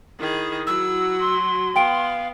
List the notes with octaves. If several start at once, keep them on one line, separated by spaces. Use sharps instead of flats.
D#3 E4 G#4
F#3 F#4 E6
C6
B3 F5 G5 D7